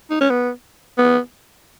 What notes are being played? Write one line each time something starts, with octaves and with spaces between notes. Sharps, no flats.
D#4
C#4
B3
B3